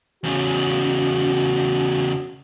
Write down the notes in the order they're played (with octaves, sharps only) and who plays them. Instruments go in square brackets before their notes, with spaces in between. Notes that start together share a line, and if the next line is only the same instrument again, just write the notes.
[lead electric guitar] E2 C#3 [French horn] F#4